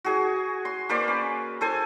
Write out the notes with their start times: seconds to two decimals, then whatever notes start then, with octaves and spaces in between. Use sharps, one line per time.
0.04 F#4 G#4 G#5
0.65 C6
0.89 A#3 B4 C5 D5
1.08 C#4
1.61 A4 C5 G#5